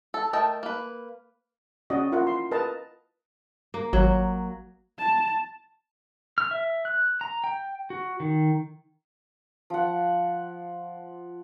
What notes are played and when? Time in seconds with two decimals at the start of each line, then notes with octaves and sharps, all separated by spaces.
0.14 A4
0.33 A3 A#4 D#5 G5 A5
0.63 A#3 B4
1.90 C#4 F#4 D5 D#5 D6
2.12 E4 F4 A#4 F5 F#5
2.27 C6
2.52 A#4 B4 D#5 A5 A#5
3.74 A#3
3.93 G#1 F#3
4.99 A5
6.38 F6
6.51 E5
6.85 F#6
7.21 A#5
7.44 G5
7.90 F#4
8.20 D#3
9.70 F3 F#5